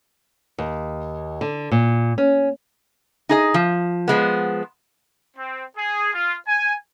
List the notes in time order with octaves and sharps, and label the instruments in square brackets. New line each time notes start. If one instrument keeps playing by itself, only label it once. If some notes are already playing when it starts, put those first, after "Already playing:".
[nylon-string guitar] D#2
D3
A#2
C#4
[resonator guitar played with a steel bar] D#4 G#4 D#5
F3
F3 G#3 B3
[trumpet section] C4
G#4
F4
G#5